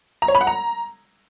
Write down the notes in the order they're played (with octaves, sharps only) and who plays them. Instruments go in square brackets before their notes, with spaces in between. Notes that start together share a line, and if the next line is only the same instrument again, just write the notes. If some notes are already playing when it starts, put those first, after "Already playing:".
[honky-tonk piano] A#5
C#5
B5
F#5
A#5